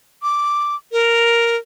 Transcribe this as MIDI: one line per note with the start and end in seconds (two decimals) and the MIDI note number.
0.23 0.76 86
0.92 1.56 70